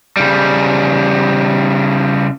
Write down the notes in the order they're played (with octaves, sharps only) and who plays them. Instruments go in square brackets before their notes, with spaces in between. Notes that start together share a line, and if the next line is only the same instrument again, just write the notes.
[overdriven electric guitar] C#3 G3